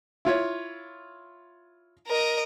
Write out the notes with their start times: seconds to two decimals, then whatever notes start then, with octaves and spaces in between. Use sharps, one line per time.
0.25 E4 F4 C#5
2.07 A#4 D#5